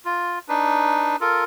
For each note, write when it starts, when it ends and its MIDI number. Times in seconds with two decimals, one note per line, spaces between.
0.05 0.39 65
0.49 1.16 62
0.49 1.16 63
0.49 1.16 71
1.21 1.44 65
1.21 1.44 69
1.21 1.44 70